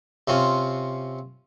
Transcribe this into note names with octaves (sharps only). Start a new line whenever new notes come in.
C3 C4 C#4 F4